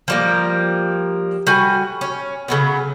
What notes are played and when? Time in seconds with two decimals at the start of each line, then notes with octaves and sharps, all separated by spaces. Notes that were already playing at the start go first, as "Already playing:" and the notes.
0.08 F3 G3 A#3
1.47 G3 F#4 G#5
2.01 C#4
2.48 C#3 F#3 B3